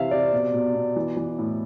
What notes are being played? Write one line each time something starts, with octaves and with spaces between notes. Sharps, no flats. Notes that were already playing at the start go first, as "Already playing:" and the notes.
Already playing: C3 E3 E5 F5
C3 D5
B2
B2
B2
E3
E3
A2